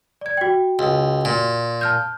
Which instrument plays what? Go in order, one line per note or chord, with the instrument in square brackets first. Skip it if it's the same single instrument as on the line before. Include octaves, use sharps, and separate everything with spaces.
[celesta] D5 G#6
F#4 G5
[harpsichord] C#2
A#2
[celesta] A5 F6 G6